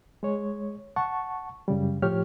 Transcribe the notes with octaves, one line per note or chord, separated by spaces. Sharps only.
G#3 C#5
F#5 A5 C#6
F#2 C#3 G3
A2 F3 G4 C#5 F6